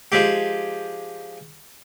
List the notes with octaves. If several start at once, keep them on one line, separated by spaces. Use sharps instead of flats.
F3 G#3 G4